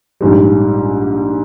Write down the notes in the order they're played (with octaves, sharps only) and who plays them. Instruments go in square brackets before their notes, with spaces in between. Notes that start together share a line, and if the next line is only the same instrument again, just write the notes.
[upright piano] A#1 G#2 G3